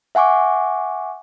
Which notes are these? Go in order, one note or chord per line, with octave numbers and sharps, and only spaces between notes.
E5 F#5 G#5 C#6 D6